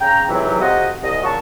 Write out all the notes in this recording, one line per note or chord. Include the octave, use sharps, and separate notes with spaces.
C#3 G5 A#5
F2 G#2 C3 E3 F#3
F2 C3 F4 F#4 D#5
C2 D#5
A#2 C#3 F#3 F#4 A5 C#6